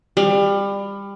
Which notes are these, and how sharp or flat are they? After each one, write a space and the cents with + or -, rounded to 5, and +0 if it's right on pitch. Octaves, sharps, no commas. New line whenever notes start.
G3 +25